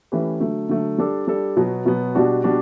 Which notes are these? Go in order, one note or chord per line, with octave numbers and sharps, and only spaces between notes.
E3 A3 C#4 G4 B4
D3 F#3 A3
D3 F#3 A3
G3 D4 A4
G3 D4 A4
B2 F#3 B3
B2 F#3 B3
B2 G3 D4 F#4
B2 G3 D4 F#4